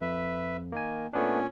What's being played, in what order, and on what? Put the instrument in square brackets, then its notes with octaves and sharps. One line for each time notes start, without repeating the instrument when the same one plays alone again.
[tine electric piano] F2 [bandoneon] B4 E5
[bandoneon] D#3 [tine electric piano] A#3 G#5
[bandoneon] A#2 C#4 [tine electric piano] A3 B3 D4